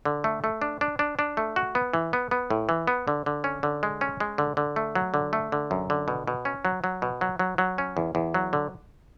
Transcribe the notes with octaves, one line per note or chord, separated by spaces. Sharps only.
D3
A3
A3
D4
D4
D4
D4
A3
F#4
B3
E3
B3
B3
A2
E3
B3
D3
D3
C#4
D3
G#3
C#4
G#3
D3
D3
A3
F#3
D3
A3
D3
F#2
D3
B2
B2
C#4
F#3
F#3
B2
F#3
F#3
F#3
C#4
E2
E2
F#3
D3